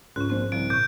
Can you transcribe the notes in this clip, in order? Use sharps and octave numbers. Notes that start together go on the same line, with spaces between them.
C#2 G#2 C#4 F#6
A#1 C4 C5
C2 C#3 F3 D7
A#2 C#6 G6